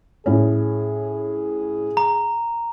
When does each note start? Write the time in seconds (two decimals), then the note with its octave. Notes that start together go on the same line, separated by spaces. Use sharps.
0.26 A2 C#4 G#4
1.97 A#5